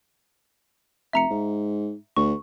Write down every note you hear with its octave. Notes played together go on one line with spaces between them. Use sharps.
F1 E5 A#5 C#7
G#2
D2 C#6